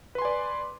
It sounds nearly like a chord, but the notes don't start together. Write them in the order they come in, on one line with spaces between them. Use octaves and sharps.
B4 C6 G#5 D5